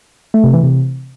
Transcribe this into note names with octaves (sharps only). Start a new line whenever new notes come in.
A3
C3
E3
C3